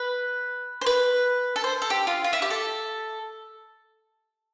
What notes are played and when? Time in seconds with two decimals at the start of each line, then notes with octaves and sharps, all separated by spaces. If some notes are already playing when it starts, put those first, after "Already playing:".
Already playing: B4
0.81 C5
0.86 B4
1.56 A4
1.64 C5
1.82 A4
1.90 G4
2.07 F4
2.24 F4
2.33 E4
2.42 G4
2.50 A4